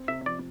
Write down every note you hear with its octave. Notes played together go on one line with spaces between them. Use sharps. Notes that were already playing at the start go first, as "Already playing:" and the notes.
Already playing: C4
C3 E5
F3 D5